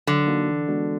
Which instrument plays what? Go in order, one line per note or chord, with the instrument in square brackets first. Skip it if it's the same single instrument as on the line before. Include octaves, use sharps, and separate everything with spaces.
[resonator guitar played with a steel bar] D3 [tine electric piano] F#3
[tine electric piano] A#3 D#4 F#4
E3
G#3 B3 D4 F#4